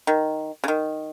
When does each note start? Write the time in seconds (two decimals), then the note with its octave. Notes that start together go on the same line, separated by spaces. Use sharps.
0.07 D#3
0.64 C#3
0.68 D#3